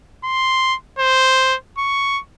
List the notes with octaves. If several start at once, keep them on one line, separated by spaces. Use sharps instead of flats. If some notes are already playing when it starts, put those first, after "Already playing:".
C6
C5
C#6